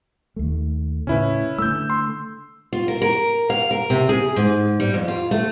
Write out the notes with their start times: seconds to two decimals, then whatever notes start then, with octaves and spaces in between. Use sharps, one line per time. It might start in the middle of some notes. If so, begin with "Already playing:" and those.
0.36 D#2 A3
1.07 A2 C#3 C#4 E4 B4
1.59 D3 A3 E6 G6
1.90 C6
2.73 F4
2.88 A#4
3.02 A#4
3.50 F5
3.71 A#4
3.90 C3
4.09 G#4
4.36 G#2
4.80 G3
4.94 F2
5.08 F4
5.31 A3